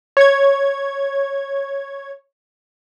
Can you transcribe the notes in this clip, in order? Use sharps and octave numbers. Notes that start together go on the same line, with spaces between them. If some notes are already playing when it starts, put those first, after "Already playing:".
C#5 G#6